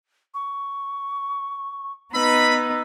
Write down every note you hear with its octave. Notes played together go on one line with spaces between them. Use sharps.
C#6
B3 D#4 B4 B5 E6